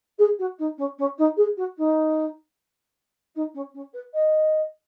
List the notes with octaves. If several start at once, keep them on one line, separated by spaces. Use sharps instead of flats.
G#4
F#4
D#4
C#4
C#4
D#4
G#4
F#4
D#4
D#4
C#4
C#4
B4
D#5